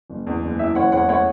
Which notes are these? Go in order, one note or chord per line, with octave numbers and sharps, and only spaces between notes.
F#1
E2
F#1
E3 E5
F#1 C#5 F#5
E2 C#5 F#5
A3 C#5 F#5